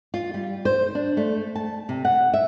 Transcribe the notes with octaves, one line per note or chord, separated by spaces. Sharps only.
F4
G3
C5
D4
A3
A5
C3
F#5
E5